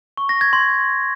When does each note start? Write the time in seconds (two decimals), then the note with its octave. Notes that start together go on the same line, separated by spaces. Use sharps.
0.17 C#6
0.29 A#6
0.41 G#6
0.53 C6